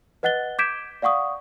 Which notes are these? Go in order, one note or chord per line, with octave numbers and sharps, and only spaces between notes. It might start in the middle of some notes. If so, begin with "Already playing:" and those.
B4 D#5 F#5 F#6 A6 G7
D6 G6 G#6 B6 D7 E7
D5 F5 F#5 C#6 D#6